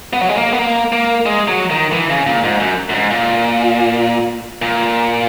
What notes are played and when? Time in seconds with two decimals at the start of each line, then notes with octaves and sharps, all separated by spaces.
0.13 B3
0.21 F#3
0.29 G#3
0.36 A#3
0.53 B3
0.59 A#3
0.92 A#3
1.26 G#3
1.48 F#3
1.70 D#3
1.93 E3
2.10 C#3
2.27 A#2
2.44 G#2
2.60 F#2
2.90 F#2
2.94 G#2
3.11 A#2
4.62 A#2